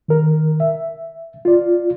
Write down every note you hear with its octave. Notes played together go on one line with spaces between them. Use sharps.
D#3 A#4
E5
F4 D5